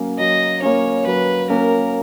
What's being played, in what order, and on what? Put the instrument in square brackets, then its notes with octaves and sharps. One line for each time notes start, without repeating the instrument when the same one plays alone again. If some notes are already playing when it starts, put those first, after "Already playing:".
Already playing: [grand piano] F#3 A#3 C#4
[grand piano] F#3 [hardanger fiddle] D#5
[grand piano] A#3 C#4 [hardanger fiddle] C#5
[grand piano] F#3 [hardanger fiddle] B4
[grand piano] A#3 C#4 [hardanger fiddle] A#4